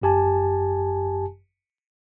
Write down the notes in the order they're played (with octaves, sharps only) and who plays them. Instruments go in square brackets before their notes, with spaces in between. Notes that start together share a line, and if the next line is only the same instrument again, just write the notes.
[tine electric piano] G1 F#2 G4 G#5 A5